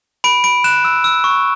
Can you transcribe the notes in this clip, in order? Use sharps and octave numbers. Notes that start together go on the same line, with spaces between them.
B5 D7
B5 D7
F#6 E7
E6
E6
C#6